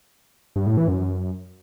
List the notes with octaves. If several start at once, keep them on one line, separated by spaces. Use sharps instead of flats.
G2
A2
E3
F#2